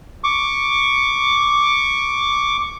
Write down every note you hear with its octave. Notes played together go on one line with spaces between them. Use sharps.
C#6 D6